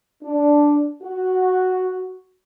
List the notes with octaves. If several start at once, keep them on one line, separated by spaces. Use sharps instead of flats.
D4
F#4